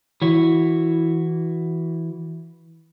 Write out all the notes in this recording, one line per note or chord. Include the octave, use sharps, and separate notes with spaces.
E3 E4 F#4 C#5